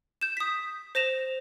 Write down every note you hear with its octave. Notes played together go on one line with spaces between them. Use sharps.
G6 E7
D#6 B6
C5 A#6 E7 F7